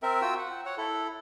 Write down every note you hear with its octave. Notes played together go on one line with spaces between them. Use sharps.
C4 A#4 E5
F4 F#4 G5 E6
F#5
C#5 F#5
E4 A4